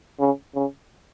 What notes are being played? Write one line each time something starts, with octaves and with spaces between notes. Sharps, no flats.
C#3
C#3